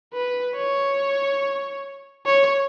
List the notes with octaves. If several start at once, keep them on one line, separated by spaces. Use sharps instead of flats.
B4
C#5
C#5